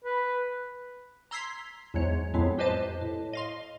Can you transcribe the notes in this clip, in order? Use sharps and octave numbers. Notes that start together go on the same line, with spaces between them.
B4
A#5 C6 E6 G#6 B6 C7
E2 G#2 F#3 G#3 C#5
F2 A2 F#3 G#3 B3 C4
G4 B4 C5 D#5 A5
A2
D#5 F5 C6